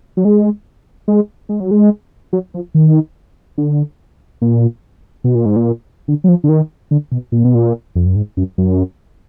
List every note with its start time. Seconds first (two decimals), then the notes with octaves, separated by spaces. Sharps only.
0.17 F#3
0.25 G#3
1.08 G#3
1.49 G#3
1.60 F#3
1.71 G#3
2.33 F#3
2.54 F3
2.75 D#3
3.58 D3
4.42 A#2
5.24 B2
5.35 A#2
5.46 G#2
5.56 A#2
6.08 D3
6.24 F#3
6.28 F3
6.44 D3
6.49 D#3
6.91 D3
7.12 B2
7.32 A#2
7.44 B2
7.55 A#2
7.95 F2
8.06 F#2
8.16 G#2
8.37 F#2
8.58 F#2